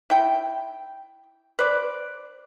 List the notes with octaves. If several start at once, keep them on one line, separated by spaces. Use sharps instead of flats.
E4 G5
B4 C5 D5